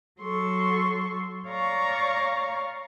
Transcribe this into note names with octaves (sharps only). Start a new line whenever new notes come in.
F#3 A4 C6 C#6
C#5 D5 F5 A#5 C#6